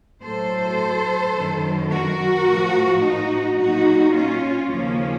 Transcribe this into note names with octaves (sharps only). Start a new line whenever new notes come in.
A2 F#3 A4 C5
F#2 D#3 F#3
F#4 A#4
A2 F3
D#4 F#4
A#2 F#3 D#4 F#4
C#4 F4
D#2 C#3 F3 A#3 C#4